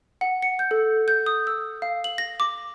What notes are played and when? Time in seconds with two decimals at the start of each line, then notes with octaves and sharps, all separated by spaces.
0.21 F#5
0.42 C#7
0.59 G6
0.71 A4
1.08 G6
1.26 D#6
1.47 E6
1.82 F5
2.04 F#7
2.18 A#6
2.40 D6